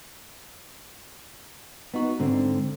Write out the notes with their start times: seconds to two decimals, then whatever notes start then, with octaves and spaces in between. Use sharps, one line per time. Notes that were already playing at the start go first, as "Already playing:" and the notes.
1.94 B3 D#4 F#4
2.19 G#2 D3 C4